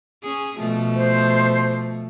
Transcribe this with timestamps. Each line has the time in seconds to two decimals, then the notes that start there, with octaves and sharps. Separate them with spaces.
0.22 C#4 G#4
0.58 B2 F3 A3
0.95 C5